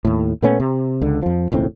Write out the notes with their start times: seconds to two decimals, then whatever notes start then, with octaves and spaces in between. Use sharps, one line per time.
0.05 D#2 A2
0.42 A#2 A3 B3 C#4
0.60 C3
1.01 C#2 D3
1.22 F2 F3
1.52 E1 C#2 A2 C4